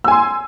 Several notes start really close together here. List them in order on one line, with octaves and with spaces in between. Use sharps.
E6 G#5 C6